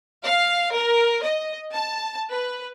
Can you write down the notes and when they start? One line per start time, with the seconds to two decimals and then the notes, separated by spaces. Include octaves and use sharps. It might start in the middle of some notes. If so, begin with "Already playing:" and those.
0.24 F5
0.74 A#4
1.23 D#5
1.72 A5
2.31 B4